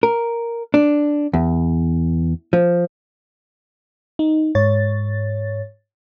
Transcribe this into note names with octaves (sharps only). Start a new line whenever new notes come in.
A#4
D4
E2
F3
D#4
G#2 C#5 A6